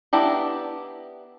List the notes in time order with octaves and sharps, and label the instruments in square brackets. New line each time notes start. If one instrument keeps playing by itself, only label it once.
[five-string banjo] B3 D4 E4 G4 A#5